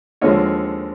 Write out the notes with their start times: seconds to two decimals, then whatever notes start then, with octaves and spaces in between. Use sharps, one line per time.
0.21 D#2 D3 F3 G#3 C#5 D#5